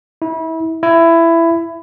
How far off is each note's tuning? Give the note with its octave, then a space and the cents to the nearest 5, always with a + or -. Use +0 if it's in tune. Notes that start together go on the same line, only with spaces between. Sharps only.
E4 -30
E4 +15